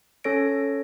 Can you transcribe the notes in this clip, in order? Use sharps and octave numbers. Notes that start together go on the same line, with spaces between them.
C#4 A4 C#5 A#6 D7